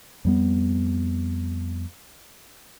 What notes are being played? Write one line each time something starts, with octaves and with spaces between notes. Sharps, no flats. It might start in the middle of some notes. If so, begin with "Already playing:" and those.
F2 G3 B3